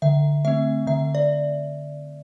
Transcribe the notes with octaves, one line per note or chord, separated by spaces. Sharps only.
D3 E5
A3 C4 E5
D3 E5
D5